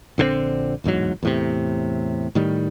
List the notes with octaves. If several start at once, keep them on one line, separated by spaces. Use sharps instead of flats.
A#1 D3 E3 C4
D1 E2 G#2 F#3
E2 A2 C3
A2 D#3 G3